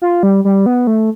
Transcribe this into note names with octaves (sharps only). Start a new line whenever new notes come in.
F4
G3
G3
B3
A3